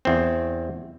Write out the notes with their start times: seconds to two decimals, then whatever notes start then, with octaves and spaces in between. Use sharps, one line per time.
0.05 E2 C4